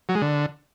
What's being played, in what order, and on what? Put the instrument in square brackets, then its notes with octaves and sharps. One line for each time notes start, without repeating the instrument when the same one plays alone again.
[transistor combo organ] F#3
G#3
D3